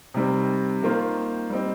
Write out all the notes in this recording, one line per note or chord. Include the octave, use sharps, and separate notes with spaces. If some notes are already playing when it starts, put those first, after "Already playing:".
C3 D#3 G3 C4
D#3 A#3 F4 C5
G3 C4 D#4